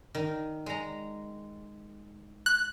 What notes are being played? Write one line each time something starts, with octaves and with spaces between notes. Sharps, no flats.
D#3
G#3 A#5
F#6